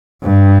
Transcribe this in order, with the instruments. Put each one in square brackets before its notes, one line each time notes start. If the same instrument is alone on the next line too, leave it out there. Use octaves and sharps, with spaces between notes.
[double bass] G2